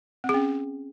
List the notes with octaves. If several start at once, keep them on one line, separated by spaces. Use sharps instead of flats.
C4
G#4
C#4